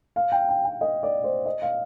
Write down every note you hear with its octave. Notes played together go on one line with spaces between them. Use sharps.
F5
G5
G5
G5
D#5
D5
C5
D#5
F5